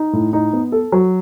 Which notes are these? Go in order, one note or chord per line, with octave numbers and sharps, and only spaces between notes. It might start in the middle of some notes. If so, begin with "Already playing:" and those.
Already playing: D#4
A2
D#4
B3
A4
F#3